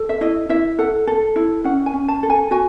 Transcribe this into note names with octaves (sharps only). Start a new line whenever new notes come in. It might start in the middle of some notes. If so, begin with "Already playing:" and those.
Already playing: A4
E5
E4 D#5
E4 E5
A4 F#5
A4
E4
C#4 F#5
G#5
C#4
A5
A4
G#5
F#4 G#5